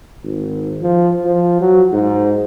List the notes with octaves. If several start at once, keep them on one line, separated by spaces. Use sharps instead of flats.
G#1
F3
F3
F#3
G#2